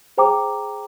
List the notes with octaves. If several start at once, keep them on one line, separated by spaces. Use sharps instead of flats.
G#4 C5 G5 A#5 D6